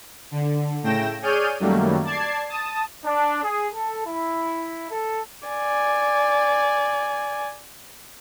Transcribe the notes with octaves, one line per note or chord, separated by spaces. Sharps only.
D3
A2 C#3 A3 G5 A#6 E7
G#4 C#5 D5 F6 G6 D#7
F#2 D#3 F#3 G3 A3 A#3
D5 A5 G#6 C7
A5 D#6
D4
G#4
A4
E4
A4
D5 G#5